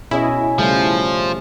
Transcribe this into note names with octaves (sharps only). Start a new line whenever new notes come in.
B2 C#4 E4 G#4 D#5 E5
C#3 F3 G3 A3